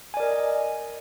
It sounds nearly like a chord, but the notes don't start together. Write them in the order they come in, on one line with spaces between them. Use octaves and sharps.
G#5 D5 A#4 D#5